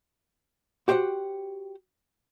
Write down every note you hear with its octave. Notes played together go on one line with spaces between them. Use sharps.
F#4 G4 C5 D5 F#5 G5